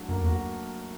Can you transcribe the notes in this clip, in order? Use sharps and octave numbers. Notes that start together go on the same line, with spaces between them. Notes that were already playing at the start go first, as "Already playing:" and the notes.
Already playing: F#3 A3 D4 F#4
F#2 A#3
E2 F#4